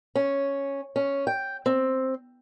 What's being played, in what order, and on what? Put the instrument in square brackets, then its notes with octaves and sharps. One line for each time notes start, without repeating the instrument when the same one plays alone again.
[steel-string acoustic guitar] C#4
C#4
G5
C4